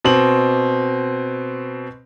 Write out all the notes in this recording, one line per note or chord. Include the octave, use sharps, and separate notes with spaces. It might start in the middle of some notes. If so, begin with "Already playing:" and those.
B2 C4 F#7